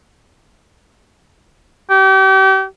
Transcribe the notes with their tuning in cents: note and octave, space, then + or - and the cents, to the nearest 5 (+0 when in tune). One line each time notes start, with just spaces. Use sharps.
G4 -35